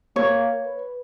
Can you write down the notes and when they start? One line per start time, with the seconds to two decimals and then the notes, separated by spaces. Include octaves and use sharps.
0.16 A#3 C#5
0.66 B4